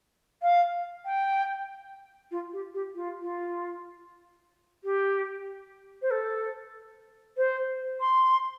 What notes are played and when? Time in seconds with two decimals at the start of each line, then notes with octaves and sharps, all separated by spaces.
0.42 F5
1.05 G5
2.31 F4
2.53 G4
2.74 G4
2.95 F4
3.22 F4
4.84 G4
6.02 C5
6.11 A4
7.37 C5
8.00 C6